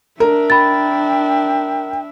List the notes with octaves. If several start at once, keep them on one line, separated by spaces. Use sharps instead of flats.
D4 A#4 E5
G5 B5 A6